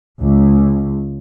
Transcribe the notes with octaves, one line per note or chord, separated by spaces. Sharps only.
C#2